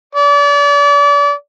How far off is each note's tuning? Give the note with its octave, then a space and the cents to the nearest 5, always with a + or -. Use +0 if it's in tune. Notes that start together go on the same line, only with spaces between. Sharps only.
D5 -35